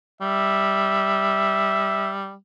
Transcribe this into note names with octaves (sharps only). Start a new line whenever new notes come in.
G3 E5